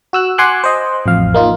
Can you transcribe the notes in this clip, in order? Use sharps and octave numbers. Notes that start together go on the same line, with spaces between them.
F#4 E6 F#6
F#5 G#5 C6 D6 F#6
C5 D#5
A1 F2 F5
A#3 D#4 F4